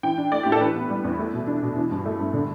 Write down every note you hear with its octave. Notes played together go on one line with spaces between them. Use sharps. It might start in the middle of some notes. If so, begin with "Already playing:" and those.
E3 G5
D4
A3 D5
A2 G4
A4
E3 B4
B3
G3
E2
A3
B2
D4
B2
E3
G2
A3
G2
D3